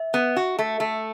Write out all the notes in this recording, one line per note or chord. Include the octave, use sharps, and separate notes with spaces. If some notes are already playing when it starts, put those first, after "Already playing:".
Already playing: E5
B3
F#4
A3
A3